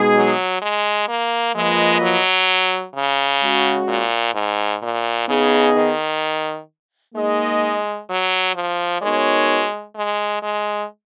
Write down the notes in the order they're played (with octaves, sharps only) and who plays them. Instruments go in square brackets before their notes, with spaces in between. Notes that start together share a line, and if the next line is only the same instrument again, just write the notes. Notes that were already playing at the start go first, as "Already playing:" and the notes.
Already playing: [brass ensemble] B2 G#3 D#4 G#4
[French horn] F#3
G#3
A#3
[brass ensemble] F3 A#3 F4 B4 D#5 [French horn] G#3
[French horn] F#3
C#3
[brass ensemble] G#3 C#4 F#4
[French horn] A#2
G#2
A#2
[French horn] C#3 [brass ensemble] B3 D#4 G#4 D#5
[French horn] D#3
[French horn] G#3 [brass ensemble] A#3 D#4 G#4 D#5
[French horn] F#3
F3
[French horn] G#3 [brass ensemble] B3 D#4 F#4 A#4 C#5
[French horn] G#3
G#3